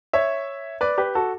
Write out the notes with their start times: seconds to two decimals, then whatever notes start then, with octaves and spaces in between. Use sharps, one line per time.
0.13 C#5 E5
0.81 B4 D5
0.98 G4 B4
1.15 F#4 A4